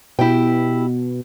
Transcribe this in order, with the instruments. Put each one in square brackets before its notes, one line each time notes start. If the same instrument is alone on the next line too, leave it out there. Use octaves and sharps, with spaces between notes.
[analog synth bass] B2 [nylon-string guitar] E4 G4 G5